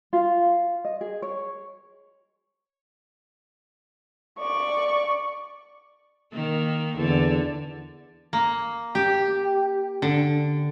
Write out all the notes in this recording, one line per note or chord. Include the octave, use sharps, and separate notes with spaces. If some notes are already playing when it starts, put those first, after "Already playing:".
F4
D#5
G#4
C#5
D5 C#6
D#3 A#3
E2 D3
A#3
G4
D3